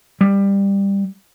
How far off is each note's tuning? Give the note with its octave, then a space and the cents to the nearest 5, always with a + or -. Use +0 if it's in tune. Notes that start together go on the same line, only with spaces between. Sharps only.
G3 +15